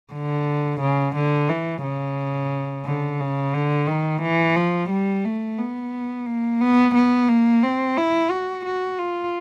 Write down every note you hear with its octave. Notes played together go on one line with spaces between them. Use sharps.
D3
C#3
D3
E3
C#3
D3
C#3
D3
D#3
E3
F3
G3
A3
B3
A#3
B3
B3
A#3
C4
E4
F#4
F#4
F4